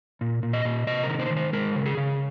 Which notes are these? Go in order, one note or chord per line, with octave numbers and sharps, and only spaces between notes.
A#2
A#2
D#5
A#2
C3 D#5
A#4
D#3
C5
D#3
C5
G#3 A#4
C#3
G#4
C#3